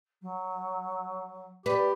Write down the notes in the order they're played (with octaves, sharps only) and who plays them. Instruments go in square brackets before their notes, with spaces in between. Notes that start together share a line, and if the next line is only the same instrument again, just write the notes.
[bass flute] F#3
[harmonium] G4 [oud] B4 [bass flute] D5